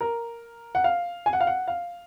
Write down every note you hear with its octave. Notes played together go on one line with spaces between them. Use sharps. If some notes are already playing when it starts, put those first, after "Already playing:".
A#4
F#5
F5
G#5
F#5
F5
F#5
F5